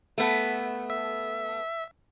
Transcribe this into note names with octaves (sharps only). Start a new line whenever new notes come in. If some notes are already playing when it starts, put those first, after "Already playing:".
A3 B3
E5